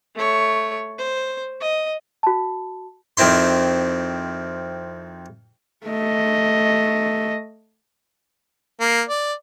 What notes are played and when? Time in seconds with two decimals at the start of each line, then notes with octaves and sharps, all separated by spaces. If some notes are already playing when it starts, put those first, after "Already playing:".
0.15 A3 C#5
0.98 C5
1.60 D#5
2.23 F#4 A5
3.17 F2 D#3 C4 E4 C6
5.86 A3 D#5
8.80 A#3
9.09 D5